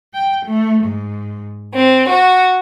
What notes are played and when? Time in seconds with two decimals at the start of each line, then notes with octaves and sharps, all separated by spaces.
0.13 G5
0.45 A3
0.83 G#2
1.73 C4
2.08 F#4